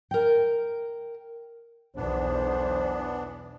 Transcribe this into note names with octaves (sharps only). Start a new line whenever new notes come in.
A#4 G5
B1 E2 E3 B3 D4 C5